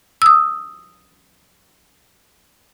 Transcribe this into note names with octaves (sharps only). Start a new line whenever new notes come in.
D#6 E6